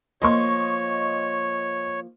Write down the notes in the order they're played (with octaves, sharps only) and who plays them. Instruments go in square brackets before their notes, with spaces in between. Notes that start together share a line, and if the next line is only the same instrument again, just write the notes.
[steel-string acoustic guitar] F3 A#3 [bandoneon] C#5 [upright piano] D#5 C6 C#6